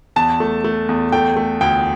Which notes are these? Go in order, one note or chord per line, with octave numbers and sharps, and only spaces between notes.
E2 A5
A3
A3
E2
A3 G5
A3
D2 G5